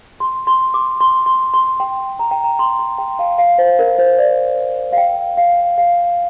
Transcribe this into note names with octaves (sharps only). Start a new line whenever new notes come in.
C6
C6
D6
C6
C6
C6
G5
A#5
G5
A#5
C6
C6
G5
F5
F5
C5
A#4
C5
D5
F5
G5
F5
F5